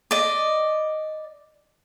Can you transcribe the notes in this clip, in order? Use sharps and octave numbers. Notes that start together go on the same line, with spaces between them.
D5 D#5